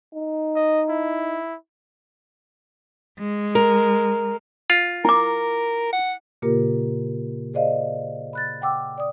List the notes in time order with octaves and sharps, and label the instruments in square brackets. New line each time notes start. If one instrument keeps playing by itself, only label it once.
[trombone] D#4
[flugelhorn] D#5
E4
[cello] G#3
[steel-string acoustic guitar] A#4
[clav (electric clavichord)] F4
[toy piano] E4 D6 [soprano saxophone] A#4
[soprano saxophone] F#5
[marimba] A#2 C#3 A#3 F4 G4 A#4
G#4 C5 D5 D#5 F5
B5 F#6 A6
F#5 G5 D6 E6
D5 D#6